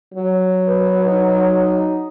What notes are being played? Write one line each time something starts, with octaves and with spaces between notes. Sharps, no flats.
F#3
B4
D#4